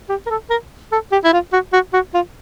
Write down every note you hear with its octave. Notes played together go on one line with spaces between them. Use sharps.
G4
A#4
A4
A#4
A4
G4
E4
F4
F#4
F#4
F#4
F4